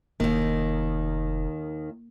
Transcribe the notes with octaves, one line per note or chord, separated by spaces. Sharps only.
F1 D#2 D#3 A#3